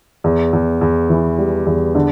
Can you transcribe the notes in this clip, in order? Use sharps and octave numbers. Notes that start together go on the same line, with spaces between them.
E2
E2
E2
E3
G3
E2
D3